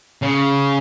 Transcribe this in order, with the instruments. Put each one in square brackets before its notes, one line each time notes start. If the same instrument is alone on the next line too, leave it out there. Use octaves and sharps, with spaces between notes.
[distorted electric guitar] C#3